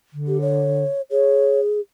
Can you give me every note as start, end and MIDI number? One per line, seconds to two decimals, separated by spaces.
0.13 0.84 50
0.27 0.41 67
0.41 1.01 73
1.11 1.80 68
1.11 1.60 73